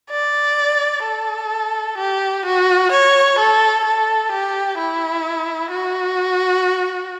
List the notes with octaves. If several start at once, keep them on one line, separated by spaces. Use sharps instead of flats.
D5
A4
G4
F#4
C#5
A4
A4
G4
E4
F#4